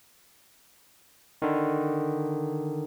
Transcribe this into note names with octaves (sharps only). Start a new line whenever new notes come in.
D3 D#3